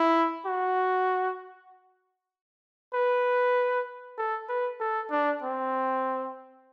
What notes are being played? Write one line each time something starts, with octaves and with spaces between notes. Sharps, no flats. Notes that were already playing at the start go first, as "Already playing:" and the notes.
Already playing: E4
F#4
B4
A4
B4
A4
D4
C4